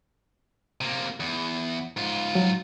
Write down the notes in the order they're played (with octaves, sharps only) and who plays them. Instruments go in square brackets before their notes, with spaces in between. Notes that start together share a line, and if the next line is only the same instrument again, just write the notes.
[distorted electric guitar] C3 A#3
E2
G#2 F4
[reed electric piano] F#3